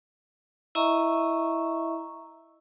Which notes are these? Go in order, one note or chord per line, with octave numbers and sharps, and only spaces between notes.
E4 D#5 E5 A#5 C#6